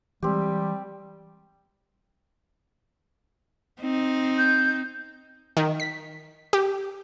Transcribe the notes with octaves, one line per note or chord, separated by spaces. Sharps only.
E3 G3 G#3 C4 G4
C4 D#4
G6
D#3
B6
G4